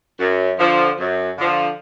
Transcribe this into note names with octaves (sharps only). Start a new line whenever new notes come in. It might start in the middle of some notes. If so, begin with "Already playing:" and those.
F#2
D3 F3
F#2
D3 F3